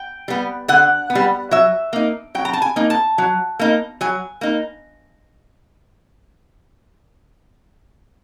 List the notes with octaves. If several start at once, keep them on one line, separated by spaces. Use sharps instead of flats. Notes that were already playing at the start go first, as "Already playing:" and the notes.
Already playing: G5
G3 B3
D3 F#5
B3
G3
F#3 E5
A#3 D#4
F#3 G5
A#5
A5
G#5
A#3 D#4
A5
F#3
A#3 D#4
F#3 G#5
A#3 D#4